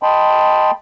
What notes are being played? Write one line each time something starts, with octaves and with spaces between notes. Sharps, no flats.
D#5 G5 A5 B5 C6